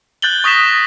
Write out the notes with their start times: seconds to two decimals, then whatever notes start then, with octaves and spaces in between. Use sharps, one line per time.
0.22 F#6 G6 A6 F#7 G7
0.44 C#6 D#6 A#6 B6 E7